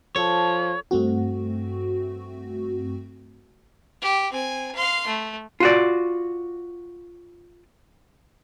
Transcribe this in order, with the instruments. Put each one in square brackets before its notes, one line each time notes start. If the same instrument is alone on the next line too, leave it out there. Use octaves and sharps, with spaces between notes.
[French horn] F3 [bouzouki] A4 [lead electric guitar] C#5
[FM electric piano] G2 A3 C4 F#4
[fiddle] G4
C4 G#5
F5 C6
A3
[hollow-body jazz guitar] F4 F#4 D5